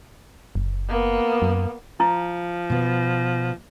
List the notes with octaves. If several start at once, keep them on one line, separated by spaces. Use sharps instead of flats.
F#1
A#3 B3
F#2
F3 E4
B2 B3